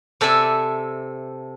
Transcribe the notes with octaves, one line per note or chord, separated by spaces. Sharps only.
C3 A4 D5 E5 G#5